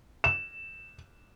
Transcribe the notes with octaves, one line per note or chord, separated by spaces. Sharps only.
E7